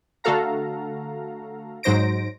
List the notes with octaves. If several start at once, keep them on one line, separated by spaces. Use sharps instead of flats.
D3 A3 F#4 A4 F5 A#5
G#2 F#3 D#4 C5 A#6 D7